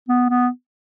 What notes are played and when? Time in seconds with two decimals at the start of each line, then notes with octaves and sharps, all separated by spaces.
0.09 B3
0.29 B3